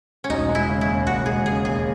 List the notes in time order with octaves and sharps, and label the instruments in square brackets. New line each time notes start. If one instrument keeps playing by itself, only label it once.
[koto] C#4
[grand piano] E1 [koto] D#4
[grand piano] G#3
[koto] E4
[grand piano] C#3
[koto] E4
[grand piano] D#2
[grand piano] E1 [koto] F#4
[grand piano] G#3 [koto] G#4
[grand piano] C#3 [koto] G#4
[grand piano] D#2 [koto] G#4